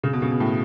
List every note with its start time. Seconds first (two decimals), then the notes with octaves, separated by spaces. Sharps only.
0.04 C#3
0.13 B2
0.22 C#3
0.31 B2
0.40 A2